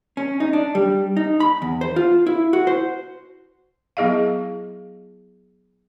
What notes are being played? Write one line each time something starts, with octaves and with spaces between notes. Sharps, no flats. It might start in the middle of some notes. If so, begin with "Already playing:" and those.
C#4
D#4
D4
G3
D#4
B5
E2
C5
F4
E4
F#4
C5
F#3 B3 E4 G#4 D#5 F5